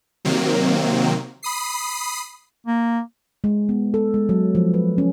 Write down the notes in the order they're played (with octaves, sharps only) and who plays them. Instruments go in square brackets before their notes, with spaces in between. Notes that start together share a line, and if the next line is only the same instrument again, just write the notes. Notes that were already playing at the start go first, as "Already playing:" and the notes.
[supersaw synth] C3 D#3 F#3 A#3 C4
B5 D#6 C7
[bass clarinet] A#3
[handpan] G#3
B3
A4
G#3
F#3
F3
B4
C#4